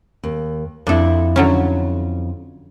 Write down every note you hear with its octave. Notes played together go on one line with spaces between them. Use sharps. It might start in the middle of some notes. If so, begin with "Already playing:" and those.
D#2
F2 C4 D4 E4 A4
D3 F#3 C#4